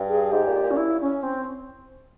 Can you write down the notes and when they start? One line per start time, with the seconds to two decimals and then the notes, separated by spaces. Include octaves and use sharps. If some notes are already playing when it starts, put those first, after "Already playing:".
Already playing: G2
0.09 G#4
0.31 G#2 G4
0.47 A#2
0.62 A#2
0.71 C#4
0.77 E4
1.01 C#4
1.23 C4